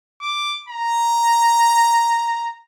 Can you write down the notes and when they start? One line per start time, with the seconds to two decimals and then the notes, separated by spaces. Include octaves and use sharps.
0.21 D6
0.69 A#5